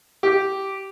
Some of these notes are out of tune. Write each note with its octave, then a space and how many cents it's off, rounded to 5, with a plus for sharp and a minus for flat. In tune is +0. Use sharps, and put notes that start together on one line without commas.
G4 -10